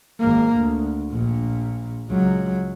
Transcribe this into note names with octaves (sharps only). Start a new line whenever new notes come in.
G#1 A#3
D2
A#1 A#2
C#2 F#3